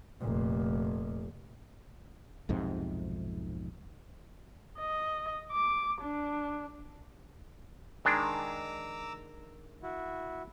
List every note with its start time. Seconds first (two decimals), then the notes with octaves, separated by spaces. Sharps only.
0.21 F1 A#2
2.49 B1 F2 G#2 C3
4.79 D#5
5.52 D6
6.02 D4
8.05 D#3 G#3 D4 A#5 D6 E6
9.83 E4 F#4